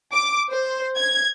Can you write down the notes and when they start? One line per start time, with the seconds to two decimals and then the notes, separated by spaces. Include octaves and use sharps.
0.13 D6
0.51 C5
0.98 G#6